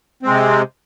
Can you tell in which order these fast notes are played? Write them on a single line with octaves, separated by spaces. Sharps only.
C4 G#3 C3